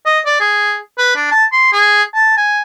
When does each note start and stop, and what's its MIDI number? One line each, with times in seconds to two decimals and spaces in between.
0.06 0.19 75
0.26 0.37 74
0.40 0.78 68
0.98 1.15 71
1.16 1.29 62
1.31 1.44 81
1.52 1.69 84
1.72 2.03 68
2.14 2.35 81
2.37 2.62 80